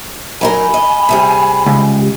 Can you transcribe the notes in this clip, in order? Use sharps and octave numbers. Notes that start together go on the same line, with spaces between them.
F#3 D#4 A#4 G#5 B5
D#5
C3 G3 G#4
C#2